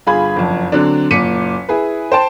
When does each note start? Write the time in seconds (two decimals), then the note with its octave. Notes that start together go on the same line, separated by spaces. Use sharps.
0.07 G1 F4 G#4 B5 G#6
0.36 F#1 F2
0.72 D3 F#3 C4 D4
1.11 F#1 A#2 D6 B6 C#7 D#7
1.69 E4 G#4 B4
2.12 C5 G5 A5 C6